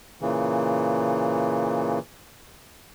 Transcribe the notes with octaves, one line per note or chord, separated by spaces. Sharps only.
A#2 C#3 E3